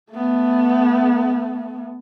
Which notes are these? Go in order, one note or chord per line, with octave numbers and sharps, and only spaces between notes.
A3 B3